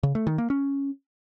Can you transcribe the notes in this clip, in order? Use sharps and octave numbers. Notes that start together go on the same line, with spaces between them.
C#3
A3
D#3
A#3
C#4